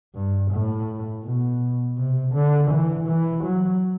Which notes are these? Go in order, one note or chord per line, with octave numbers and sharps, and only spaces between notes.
G2
A2
B2
C3
D3
E3
E3
F#3